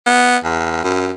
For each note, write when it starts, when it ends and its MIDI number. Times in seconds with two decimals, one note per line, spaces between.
0.06 0.37 59
0.44 0.83 40
0.83 1.14 42